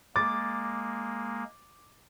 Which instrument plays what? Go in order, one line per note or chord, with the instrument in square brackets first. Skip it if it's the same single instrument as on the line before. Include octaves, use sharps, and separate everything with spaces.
[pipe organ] G#3 A#3 [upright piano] D6 A6